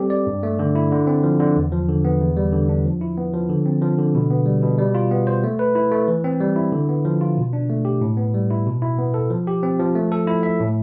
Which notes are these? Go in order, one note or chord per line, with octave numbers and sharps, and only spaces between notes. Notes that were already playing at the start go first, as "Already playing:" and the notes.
Already playing: G3 C4 G4 A4
D5
G2
A3
D3
E4
D3
C4
F3
D3
E2
F3
D3
B3
E2
G3
D3
D4
F3
E4
B3
F3
D3
C4
F3
D3
B2
B3
G3
B2
G3
F4
B3
C5
A3
B4
E4
A3
E3
C4
G3
E4
D3
B3
F3
F4
B2
D4
A3
G4
A2
B3
G3
E4
B2
E4
B3
A4
F3
G4
C4
F3
A3
A4
E4
E5
A2